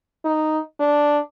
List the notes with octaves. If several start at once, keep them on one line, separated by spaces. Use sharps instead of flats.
D#4
D4